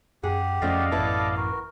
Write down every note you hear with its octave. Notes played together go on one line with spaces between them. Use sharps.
F#2 G4 G#4 F#5
F2 F3 A3 C#4 C5 D5 D#5 F5
A1 F#2 B3 E4 A4 B4 A5 D6
F#4 A#4